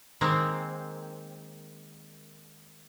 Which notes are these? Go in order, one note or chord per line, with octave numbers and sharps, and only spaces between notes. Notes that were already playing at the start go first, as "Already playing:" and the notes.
D#3 G#3 A#3 C4